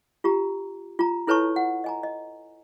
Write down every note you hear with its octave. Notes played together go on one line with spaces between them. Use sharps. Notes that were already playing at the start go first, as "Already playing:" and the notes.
F4 G4 A#5
F4 A#5
E4 A4 B4 C#5 A5 C#6
F#5
D#5 G#5 A#5
D#5